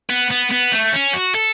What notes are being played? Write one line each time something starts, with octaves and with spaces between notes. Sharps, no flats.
B3
B3
B3
A3
C#4
F#4
A4